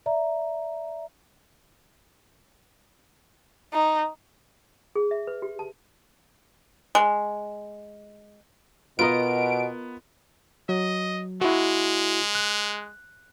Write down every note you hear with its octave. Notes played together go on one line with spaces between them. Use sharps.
D5 E5 A#5
D#4
G#4
E5
B4
G4
A5
G#3
B2 B3 F4 A#4 D#5 D7
F#3 D#5
G#3 E4 F#4
F#6